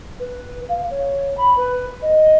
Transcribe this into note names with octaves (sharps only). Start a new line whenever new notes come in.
B4
F5
C#5
B5
B4
D#5